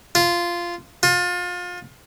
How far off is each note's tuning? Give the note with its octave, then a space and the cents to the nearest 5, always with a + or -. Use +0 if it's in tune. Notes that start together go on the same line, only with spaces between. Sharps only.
F4 -10
F4 +30